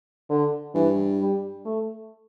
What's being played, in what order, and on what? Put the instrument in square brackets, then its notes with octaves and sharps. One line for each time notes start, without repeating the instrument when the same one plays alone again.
[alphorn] D3
[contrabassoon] G2 [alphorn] E3
[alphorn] G3
A3